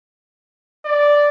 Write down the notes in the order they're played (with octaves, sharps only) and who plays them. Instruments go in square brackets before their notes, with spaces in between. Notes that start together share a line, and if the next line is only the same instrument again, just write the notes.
[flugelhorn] D5